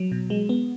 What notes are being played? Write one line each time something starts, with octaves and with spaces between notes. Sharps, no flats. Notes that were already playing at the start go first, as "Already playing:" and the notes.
Already playing: F#3
B2
G#3
B3